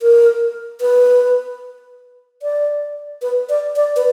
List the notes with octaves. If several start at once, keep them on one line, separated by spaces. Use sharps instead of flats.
A#4
B4
D5
B4
D5
D5
B4